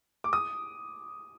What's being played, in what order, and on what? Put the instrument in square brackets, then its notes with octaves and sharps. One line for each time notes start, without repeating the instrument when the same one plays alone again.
[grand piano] D6
D#6